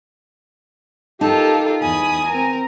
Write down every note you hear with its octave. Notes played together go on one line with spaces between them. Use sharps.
D#4 F4 G4 A4 A#4 A5
E2 G#5 B5 D#6
C4 A#4 A#5